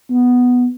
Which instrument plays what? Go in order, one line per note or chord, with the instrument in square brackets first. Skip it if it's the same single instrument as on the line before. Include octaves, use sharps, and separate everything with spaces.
[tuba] B3